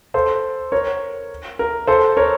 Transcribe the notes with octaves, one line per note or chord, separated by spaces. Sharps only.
A4 C5
A#4 C#5
A#4
A4 C5
A#4 C#5